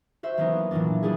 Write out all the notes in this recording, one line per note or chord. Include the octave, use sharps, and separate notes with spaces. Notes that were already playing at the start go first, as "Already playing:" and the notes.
F#4 C5 E5
E3 F#3 A#3 B3 C#4 D#4
A#2 E3 F#3 A#3 D4
G3 A3 D4 E4 G#4